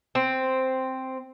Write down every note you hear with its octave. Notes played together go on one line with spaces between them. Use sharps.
C4